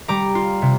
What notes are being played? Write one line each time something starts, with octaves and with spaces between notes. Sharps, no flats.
G3 A#5 D6
F4
C3